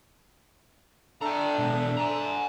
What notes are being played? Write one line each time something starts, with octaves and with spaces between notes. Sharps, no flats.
D4 A4 E5 G5 A#5
B2 G#3
G#5 A#5